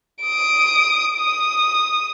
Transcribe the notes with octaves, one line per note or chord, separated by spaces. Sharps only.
D#6 D7
D#6